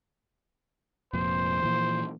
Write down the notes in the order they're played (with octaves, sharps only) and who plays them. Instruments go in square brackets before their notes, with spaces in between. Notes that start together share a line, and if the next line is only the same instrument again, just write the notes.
[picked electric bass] F1 F2 A#2 [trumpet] C5
[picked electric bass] A#2 E3 F3